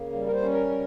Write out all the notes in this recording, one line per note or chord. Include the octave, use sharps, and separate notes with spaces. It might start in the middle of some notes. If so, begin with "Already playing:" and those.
Already playing: C#3 A#3
G3
A#4
C5
C#4
A#4
C#3